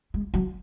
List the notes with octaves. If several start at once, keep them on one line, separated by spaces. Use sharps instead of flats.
G#3
F#3